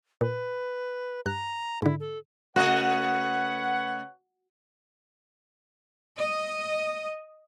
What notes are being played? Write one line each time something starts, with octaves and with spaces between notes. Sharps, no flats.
A#2 B4
G2 A#5 F#6
G#2 D3 E4
A4
C#3 A3 F#4 B4 C#5 D#5 F#5
D#5